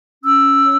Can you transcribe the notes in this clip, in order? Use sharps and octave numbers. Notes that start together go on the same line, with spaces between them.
C#4 E6
C#5